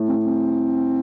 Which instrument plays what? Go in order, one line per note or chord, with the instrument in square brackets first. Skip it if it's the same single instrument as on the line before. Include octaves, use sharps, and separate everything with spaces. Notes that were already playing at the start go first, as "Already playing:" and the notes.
Already playing: [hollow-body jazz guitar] A2
[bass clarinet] C4
C4